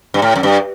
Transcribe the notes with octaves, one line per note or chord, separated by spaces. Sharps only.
G2
A2
F#2
G2